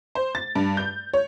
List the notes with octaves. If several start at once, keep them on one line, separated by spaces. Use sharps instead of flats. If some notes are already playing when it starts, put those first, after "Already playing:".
C5
A6
G2
G6
C#5